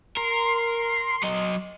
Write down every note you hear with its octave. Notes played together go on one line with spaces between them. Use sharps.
A#4 C6
F#3 D#5